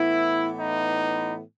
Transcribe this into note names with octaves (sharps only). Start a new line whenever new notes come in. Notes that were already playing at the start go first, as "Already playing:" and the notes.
Already playing: A2 E3 B3 E4
D#4